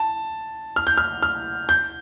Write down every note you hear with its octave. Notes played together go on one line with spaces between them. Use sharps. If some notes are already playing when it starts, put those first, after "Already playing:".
Already playing: A5
F6
G6
F6
F6
G6